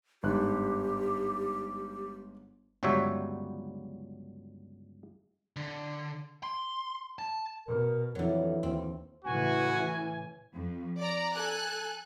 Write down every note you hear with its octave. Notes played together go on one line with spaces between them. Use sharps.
G1 G#2 G4 F#6
G1 C#2 F#3 G3 C#5 E5
D3
C6
A5
B2 A#4
F2 D3 E3 F#3
D#2 C4
A2 C#3 E3 F#4 G#5
F2
D5 A#5
A4 G#5 F#6